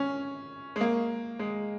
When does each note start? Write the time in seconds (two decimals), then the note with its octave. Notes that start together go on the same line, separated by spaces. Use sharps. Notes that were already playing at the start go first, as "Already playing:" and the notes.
Already playing: C#4
0.76 G#3
0.81 A#3
1.39 G#3